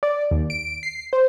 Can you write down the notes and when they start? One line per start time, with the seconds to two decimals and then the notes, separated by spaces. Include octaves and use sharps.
0.03 D5
0.31 D#2
0.50 D7
0.83 C7
1.13 C5